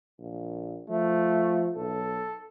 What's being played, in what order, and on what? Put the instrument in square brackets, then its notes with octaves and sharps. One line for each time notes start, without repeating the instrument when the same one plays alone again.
[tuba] A#1
[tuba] F3 [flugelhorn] A3
[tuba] B1 [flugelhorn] A4